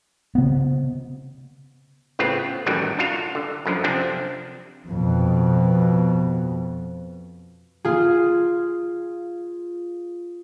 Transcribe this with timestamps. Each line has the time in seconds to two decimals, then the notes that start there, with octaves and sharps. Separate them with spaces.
0.35 C#3 B3
2.19 A2 C#3 B3 C4 F4
2.66 F#2 A2 D#3 E3 F#3 G3
2.99 D4 F4 F#4 F5
3.35 D3
3.66 F#2 D3 F3
3.84 C3 F3 C4 D4
4.88 F2 B2
7.85 F4 G#4